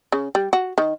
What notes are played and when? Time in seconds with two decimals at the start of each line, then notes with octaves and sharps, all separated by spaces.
0.12 C#3
0.35 G3
0.53 F#4
0.78 D#3